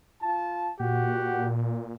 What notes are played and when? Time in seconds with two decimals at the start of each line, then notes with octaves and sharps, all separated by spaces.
0.21 F4 A5
0.80 A#2 F#4 G4 F#5